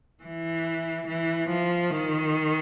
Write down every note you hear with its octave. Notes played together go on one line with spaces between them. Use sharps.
E3
E3
F3
D#3